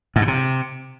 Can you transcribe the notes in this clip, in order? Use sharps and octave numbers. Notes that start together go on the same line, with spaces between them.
G#2
B2
C3